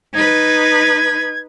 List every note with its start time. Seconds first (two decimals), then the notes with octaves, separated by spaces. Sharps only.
0.14 D#4 B4 G#6